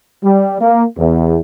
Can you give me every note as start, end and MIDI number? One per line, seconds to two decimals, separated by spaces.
0.23 0.58 55
0.60 0.84 58
0.97 1.39 40